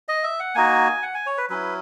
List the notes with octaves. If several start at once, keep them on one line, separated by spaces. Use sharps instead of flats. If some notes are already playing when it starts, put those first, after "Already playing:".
D#5
E5
F#5
A#3 D#4 F#4 G#5
F#5
G#5
C#5
B4
F#3 C#4 E4 B4